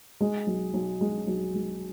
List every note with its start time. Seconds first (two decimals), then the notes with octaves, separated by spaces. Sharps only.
0.21 G#3
0.47 B1
0.74 B1
1.01 G#3
1.27 B1
1.54 G#3